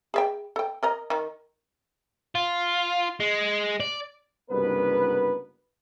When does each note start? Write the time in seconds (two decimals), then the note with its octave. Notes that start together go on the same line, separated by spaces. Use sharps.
0.14 G#4 E5 G5
0.56 A4 G5
0.83 A#4 D#5 A#5
1.10 D#3
2.35 F4
3.20 G#3
3.80 D5
4.50 F#1 C2 G2 B3 A#4 B4